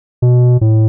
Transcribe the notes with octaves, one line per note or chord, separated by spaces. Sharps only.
B2
A2